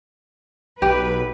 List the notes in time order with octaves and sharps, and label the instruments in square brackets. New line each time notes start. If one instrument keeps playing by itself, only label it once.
[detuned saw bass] B1 [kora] G4 [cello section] B4